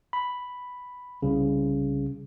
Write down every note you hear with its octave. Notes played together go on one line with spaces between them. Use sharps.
B5
C2 C#3